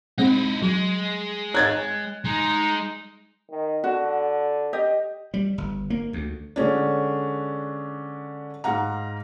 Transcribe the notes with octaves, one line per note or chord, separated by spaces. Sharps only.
G#3 C4 D#4 E4 F#5
F#3 G#3
C#5 F#6 G#6 A6
G#3 D#4
D#3
D3 F#4
G4 D#5
G3
G1
A#3
D2
D3 G#3 C#4 D4
G#2 F5 F#5 A#5